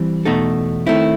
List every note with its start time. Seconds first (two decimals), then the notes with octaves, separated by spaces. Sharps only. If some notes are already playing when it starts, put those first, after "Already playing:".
Already playing: E3 G3 C4
0.25 E2 B2 A3 D#4 A4
0.87 D#3 A3 C4 E4